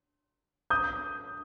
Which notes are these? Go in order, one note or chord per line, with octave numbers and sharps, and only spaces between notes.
D#6 G6